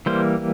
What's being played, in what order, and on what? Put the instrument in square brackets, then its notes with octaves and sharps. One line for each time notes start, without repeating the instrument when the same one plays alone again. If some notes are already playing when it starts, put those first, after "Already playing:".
[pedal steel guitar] E3 G3 A#3 C5